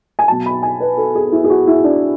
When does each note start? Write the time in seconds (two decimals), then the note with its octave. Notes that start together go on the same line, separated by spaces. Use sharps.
0.19 G#5
0.28 B2 F#3 A5
0.46 B5
0.63 G#5
0.80 B4
0.98 A4
1.15 G#4
1.32 E4
1.44 G#4
1.50 F#4
1.67 E4
1.84 D4